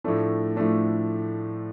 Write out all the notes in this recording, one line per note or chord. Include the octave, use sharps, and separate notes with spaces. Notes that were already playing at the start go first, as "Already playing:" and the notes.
A2 F3 A3 D4
A2 F3 A3 D4